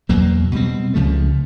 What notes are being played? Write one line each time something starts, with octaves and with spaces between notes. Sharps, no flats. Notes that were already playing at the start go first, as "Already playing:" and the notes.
E2 B2 F#3 A#3
B2 G3 C4
C#2 C#3 F3 A3